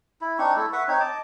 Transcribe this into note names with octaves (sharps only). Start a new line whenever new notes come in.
E4
C4 D4 D#4 C#6
A3 E4 A4
B4 E5 F#5 C#6
C4 D#4 C#5
D#5 A5 D6